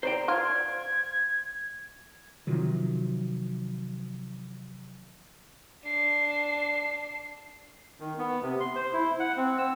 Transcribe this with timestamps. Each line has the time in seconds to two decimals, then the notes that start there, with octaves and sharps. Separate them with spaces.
0.03 C5 D5 G5 A#5
0.28 F4 G#6
2.47 C3 D#3 F3 F#3
5.84 D4 C7
8.00 D#3
8.19 B3
8.43 C3
8.60 C6
8.76 C5
8.93 E4
9.20 F#5
9.37 C4
9.58 E6